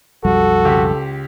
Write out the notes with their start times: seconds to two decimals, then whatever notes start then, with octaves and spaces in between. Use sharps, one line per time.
0.25 B1 F2 G3 F#4 A4
0.65 C#2 G4